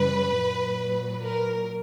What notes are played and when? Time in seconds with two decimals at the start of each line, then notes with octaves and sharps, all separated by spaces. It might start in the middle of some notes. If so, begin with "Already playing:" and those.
Already playing: F#2 C#3 E3 G3 B4
0.39 A#2 F#3
1.24 A#4